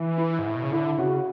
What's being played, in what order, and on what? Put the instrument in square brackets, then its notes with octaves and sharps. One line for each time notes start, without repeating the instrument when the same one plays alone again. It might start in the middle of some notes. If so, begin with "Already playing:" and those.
Already playing: [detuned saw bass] E3
[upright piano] E4
[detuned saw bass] G#2
A2
B2
C#3
[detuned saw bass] D3 [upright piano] E4
[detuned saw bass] C#3 [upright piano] F#4